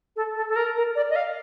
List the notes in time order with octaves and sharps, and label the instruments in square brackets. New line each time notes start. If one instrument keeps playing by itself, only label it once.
[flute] A4
A4
A4
A#4
A#4
D5
D#5
F5